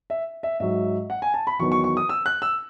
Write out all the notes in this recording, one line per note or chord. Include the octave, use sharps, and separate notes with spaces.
E5
E5
G#2 F#3 E5
F#5
G#5
A5
B5
E2 D#3 F#3 C#6
C#6
C#6
D#6
E6
F#6
E6